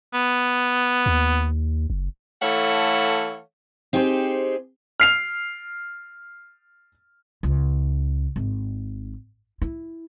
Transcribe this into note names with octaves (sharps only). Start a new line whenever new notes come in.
B3
D#2
F#1
E3 A3 A4 C#5 F5 F#5
C4 D#4 G4 G#4 C5
F6 C7 F7
C#2
G#1
E4